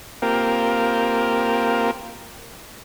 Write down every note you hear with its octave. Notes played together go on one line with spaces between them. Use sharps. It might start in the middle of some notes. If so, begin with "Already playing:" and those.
A#3 C4 F4 G4 A#4